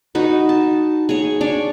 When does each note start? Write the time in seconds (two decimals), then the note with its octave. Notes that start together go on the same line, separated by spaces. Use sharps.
0.15 D#4 F#4 B4
0.49 A5
1.09 G#4 C#5
1.41 D4 C#5 D5